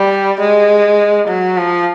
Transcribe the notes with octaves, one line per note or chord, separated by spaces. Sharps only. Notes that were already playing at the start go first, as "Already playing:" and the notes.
Already playing: G3
G#3
F#3
F3